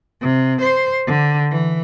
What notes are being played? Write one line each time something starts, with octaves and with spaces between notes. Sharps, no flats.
C3
C5
D3
E3